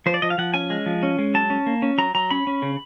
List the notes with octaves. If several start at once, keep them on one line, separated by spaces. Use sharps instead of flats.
F3 C5
D5
F3 D#5
F5
F3 F#5
C#4 G#5
G#3
F3
C#4
G#3
F#3 A5
C#4
A#3
C#4
F#3 A#5
F#3 A#5
C#4 B5
C#4
C#3